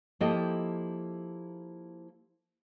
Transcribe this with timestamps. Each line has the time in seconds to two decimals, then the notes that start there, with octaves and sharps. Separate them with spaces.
0.20 F3 A#3 E4 G4 A4 D#5